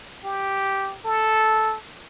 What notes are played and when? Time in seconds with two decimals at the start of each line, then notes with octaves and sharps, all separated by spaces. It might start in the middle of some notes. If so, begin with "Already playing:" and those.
0.24 G4
1.05 A4